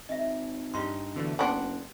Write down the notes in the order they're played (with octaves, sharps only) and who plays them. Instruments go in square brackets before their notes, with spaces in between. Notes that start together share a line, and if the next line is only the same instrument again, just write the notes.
[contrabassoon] G#1 [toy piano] D#5 E5
[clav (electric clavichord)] G2 D#4 [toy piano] F4 G4 C6
[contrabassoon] B2 [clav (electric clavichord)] D3 E3 A3
[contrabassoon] F#1 [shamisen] B3 D4 [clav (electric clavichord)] F#5 [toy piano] G5 C6 C#6